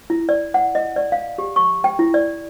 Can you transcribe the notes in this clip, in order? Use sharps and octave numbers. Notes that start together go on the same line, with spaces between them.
E4
D5
F#5
D#5
D5
F5
G4
C#6
G5
E4
D5